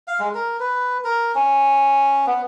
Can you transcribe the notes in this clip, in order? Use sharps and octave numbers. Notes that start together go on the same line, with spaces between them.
F5
G#3
A#4
B4
A#4
C#4
B3